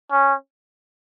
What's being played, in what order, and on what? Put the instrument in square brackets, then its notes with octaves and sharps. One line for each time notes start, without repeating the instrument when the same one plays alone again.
[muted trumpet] C#4